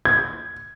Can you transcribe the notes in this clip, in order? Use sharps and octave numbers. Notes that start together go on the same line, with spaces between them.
G#6